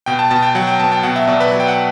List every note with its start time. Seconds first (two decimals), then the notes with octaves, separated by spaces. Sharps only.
0.06 B2 G5
0.19 A5
0.31 B2 A5
0.42 G5
0.55 F#3 F#5
0.67 G5
0.80 B3 A5
0.92 G5
1.03 B2 F#5
1.16 E5
1.27 B2 D5
1.40 B4
1.52 F#3
1.60 G5
1.68 F#5